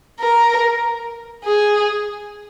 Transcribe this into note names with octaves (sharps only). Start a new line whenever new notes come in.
A#4
G#4